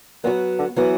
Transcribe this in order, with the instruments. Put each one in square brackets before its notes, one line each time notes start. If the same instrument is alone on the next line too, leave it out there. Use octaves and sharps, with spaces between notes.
[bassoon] A#2 [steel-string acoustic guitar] F#3 B3 F#4
[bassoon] D3
[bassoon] E3 [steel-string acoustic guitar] F#3 B3 F#4